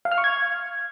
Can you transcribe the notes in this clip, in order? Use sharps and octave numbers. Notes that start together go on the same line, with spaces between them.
F5
F6
C#6
G#6